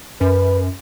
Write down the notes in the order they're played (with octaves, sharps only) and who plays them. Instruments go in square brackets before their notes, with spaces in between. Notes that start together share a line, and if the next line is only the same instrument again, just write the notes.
[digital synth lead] F#2 [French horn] B4